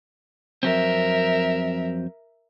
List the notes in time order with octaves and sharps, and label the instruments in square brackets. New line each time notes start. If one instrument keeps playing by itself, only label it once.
[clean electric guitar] F2 F#3 C4 [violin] A#4 E5